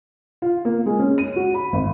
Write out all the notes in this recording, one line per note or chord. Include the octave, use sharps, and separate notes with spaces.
F4
A#3
G#3
C#4
D#7
F#4
B5
G#1